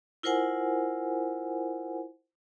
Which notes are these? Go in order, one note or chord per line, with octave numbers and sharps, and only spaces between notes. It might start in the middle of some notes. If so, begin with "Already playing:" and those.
E4 F4 A#4 C5 F#5 G#5